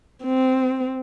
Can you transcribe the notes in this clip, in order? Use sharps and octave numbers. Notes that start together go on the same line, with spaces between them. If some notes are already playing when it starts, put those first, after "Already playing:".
C4